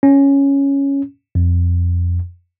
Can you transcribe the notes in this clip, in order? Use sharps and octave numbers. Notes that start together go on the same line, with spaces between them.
C#4
F2